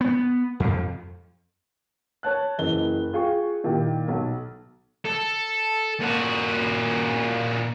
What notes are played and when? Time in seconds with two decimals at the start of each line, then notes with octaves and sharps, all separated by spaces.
0.01 B3
0.60 F2
2.23 C#5 A5 F#6
2.58 F#1 E3 D#5 G7
3.13 F4 G#4 F5 G5 C#6
3.64 A#2 D#3 E4 G4
4.08 B1
5.05 A4
6.01 A#2 F#4